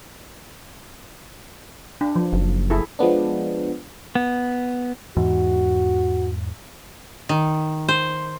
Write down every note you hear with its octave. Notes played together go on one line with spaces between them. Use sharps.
D4
F3
F#1
E4 G#4 A4
F3 G#3 B3 D4
B3
E2 G#2 E3 F#4
D#3
C5